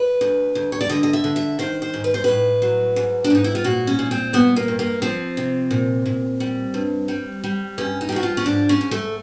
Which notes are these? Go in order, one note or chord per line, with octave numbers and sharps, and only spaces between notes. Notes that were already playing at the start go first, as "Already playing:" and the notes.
Already playing: B4
D2
D2
C#5
D5
D3 D#5
D#5
E5
D3
E5
D#3 C5
C5
G#2
B4
C5
A2 B4
F#3
G#2
D4
G#2 D#4
E4
F4
A#2 F#4
C#4
A#2
C4
G2 B3
A#3
G2
A#3
F3 C4
C3
A#2
A#2
G3
G2
G3
G3
G2 C#4
D#4
G4
F3 F#4
F4
C#4
G#2 D4
C#4
G#2
A3